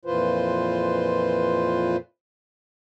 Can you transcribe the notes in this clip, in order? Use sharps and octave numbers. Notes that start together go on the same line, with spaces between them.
F2 A#2 E3 F4 B4 C5